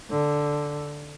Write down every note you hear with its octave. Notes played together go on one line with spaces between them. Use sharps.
D3